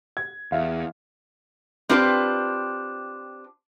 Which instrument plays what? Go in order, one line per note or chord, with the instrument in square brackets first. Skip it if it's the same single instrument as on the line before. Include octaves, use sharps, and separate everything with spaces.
[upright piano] G#6
[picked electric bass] E2 [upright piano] E5 F5
[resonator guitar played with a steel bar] C4 D4 F4 G4 B4